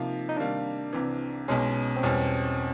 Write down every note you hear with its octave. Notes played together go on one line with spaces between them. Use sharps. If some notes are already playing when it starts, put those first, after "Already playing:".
Already playing: C3 F3 A#3 D#4
D#4
C3 D#3 G3 A#3 D4
C2 C3 E3
B1 B2 G#3 C#4
C4
E2 B2 G3 C#4